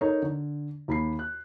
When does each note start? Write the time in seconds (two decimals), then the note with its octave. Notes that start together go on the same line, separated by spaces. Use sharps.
0.01 D#4 A4 A#4 C#5
0.22 D3
0.88 D#2 B5 C7
1.19 F#6